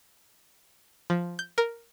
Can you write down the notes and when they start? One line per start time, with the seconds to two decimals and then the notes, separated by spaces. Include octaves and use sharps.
1.10 F3
1.39 G6
1.58 A#4